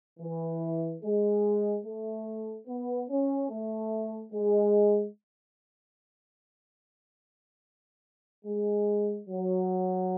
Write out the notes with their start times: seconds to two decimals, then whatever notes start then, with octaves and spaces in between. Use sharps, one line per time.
0.20 E3
1.03 G#3
1.85 A3
2.67 B3
3.09 C#4
3.50 A3
4.33 G#3
8.45 G#3
9.28 F#3